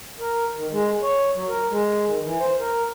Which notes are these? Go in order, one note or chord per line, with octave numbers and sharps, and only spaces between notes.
A#4
D#3
G#3
C#5
F#3
A#4
G#3
D#3
E3
C5
A#4